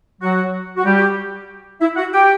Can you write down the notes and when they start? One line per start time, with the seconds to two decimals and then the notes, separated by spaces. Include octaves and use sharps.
0.22 F#3 F#4
0.77 F#4
0.85 G3 G4
1.81 E4 E5
1.97 F#4 F#5
2.13 G4 G5